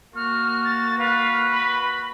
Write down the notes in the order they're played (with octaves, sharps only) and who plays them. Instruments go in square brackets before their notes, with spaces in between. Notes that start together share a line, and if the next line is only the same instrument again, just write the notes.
[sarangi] A#3 [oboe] F#4 [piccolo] F6
[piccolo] A6
[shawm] B4 [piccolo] F5
[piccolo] B5